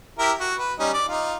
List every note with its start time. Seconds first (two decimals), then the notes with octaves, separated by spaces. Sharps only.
0.19 E4 G4 A#4
0.40 F#4
0.58 B4
0.79 G3 C#4 D#4
0.94 D5
1.09 D#4 F4